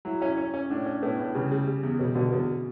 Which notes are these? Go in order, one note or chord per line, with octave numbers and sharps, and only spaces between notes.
F#3 E4
C#4 E4
C#4
C#4
A2 D4
C#4
A2 B3
A2
C#3 G3
G3
G3
E2
B2 G3
B2 D3
E2 B2